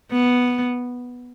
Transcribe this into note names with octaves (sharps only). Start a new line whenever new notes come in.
B3